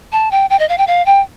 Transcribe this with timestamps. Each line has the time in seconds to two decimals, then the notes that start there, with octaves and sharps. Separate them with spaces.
0.12 A5
0.31 G5
0.50 G5
0.59 D#5
0.69 F5
0.78 G5
0.87 F5
1.06 G5